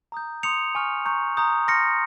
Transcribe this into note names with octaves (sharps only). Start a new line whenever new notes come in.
A#5 D#6 G6
C6 D#6 G6 C#7 F7
G#5 C#6 F6
A#5 C#6 G6
A#5 D#6 G6
C6 F6 A#6 C#7